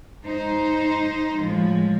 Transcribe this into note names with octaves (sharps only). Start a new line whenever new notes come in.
D#4 C5
A2 F3 G#3